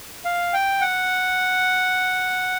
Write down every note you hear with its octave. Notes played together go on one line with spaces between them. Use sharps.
F5
G5
F#5